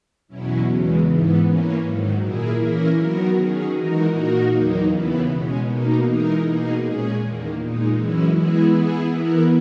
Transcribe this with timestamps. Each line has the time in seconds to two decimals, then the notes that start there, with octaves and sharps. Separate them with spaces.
0.28 E2 B2 F#3 C#4 E4
0.66 E2 C#3 E3 G#3
1.04 G#2 E3 B3
1.43 E3 A#3 C#4
1.80 G#2 D#3 F#3
2.19 A#2 A#3 E4 G#4
2.58 E3 A#3 C#4 E4 A#4
2.96 D#3 F#3 B3 F#4 A#4
3.34 D#3 F#3 C#4 G#4
3.72 E3 G#3 D#4 F#4 A#4
4.10 A#2 A#3 D#4 F#4 A#4
4.49 E2 D#3 F#3 A#3 D#4
4.87 D#2 C#3 E3 B3 E4
5.26 B2 G#3 C#4
5.64 B2 A#3 D#4
6.02 E3 G#3 D#4 A#4
6.41 B2 A#3 D#4 G#4
6.78 A#2 G#3 C#4 G#4
7.17 E2 D#3 A#3
7.55 A#2 G#3 D#4
7.94 F#2 E3 G#3 C#4 E4
8.32 E3 G#3 B3 E4 G#4
8.70 E3 B3 E4 G#4
9.09 E3 B3 E4 A#4